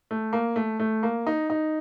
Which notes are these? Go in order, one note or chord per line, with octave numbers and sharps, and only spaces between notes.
A3
A#3
A3
A3
A#3
D#4
D#4